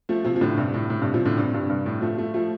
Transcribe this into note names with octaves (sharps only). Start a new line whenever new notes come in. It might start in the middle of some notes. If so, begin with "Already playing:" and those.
F3 A3
C3 F3
F3
A2 D3
G2 C3
A2
A2
G2 C3
C3 F3
A2 D3
G2 C3
G2 C3
G2
A2
F3 A3
F3 A3
F3 A3